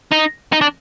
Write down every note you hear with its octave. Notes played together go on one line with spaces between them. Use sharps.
D#4
D#4
D4